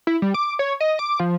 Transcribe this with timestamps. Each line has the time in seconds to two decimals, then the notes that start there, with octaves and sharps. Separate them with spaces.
0.07 E4
0.22 G3
0.34 D6
0.59 C#5
0.80 D#5
0.99 D6
1.20 F3